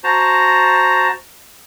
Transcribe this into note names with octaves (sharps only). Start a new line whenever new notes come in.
F#4 C5 A5 A#5